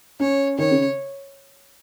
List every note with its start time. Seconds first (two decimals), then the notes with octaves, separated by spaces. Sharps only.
0.20 C#4 C#5
0.58 D#3 C#5
0.71 C#3